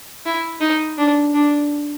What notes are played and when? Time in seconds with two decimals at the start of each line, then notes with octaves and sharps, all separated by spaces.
0.26 E4
0.61 D#4
0.98 D4
1.34 D4